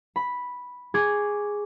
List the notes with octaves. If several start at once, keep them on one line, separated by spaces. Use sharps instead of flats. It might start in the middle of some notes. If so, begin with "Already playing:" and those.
B5
G#4 C#6 D6 G#6